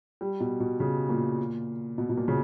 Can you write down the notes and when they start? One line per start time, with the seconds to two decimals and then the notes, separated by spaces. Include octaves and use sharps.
0.21 G3
0.40 B2
0.60 B2
0.80 C#3
1.09 A#2
1.98 B2
2.09 B2
2.18 A#2
2.28 C#3